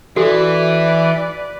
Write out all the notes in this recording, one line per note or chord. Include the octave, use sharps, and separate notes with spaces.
E3 F#4 A4 B4 D5